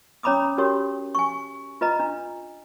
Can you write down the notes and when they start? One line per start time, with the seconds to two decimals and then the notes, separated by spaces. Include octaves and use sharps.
0.23 C#4 C#5 A#5 B5 D6 D#6
0.58 C#4 F#4 G4 A#4 C#5
1.15 G#5 C#6
1.81 F4 B4 D#5 A#5
2.00 D4